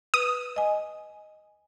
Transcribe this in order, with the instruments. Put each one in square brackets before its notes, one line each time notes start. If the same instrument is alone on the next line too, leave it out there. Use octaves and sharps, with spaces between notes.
[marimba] B4 [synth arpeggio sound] D#6
[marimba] D#5 G#5